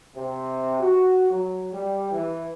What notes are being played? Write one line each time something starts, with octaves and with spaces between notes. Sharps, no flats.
C3
F#4
F#3
G3
E3